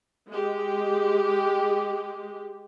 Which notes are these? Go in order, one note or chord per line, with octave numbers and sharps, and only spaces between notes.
G#3 G4